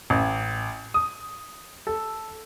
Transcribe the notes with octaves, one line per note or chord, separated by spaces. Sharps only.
A1
D#6
A4